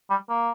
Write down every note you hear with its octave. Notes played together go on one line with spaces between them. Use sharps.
G3
A#3